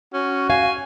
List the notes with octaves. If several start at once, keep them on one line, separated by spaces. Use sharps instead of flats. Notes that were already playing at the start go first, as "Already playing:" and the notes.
C#4 F#4
F5 G#5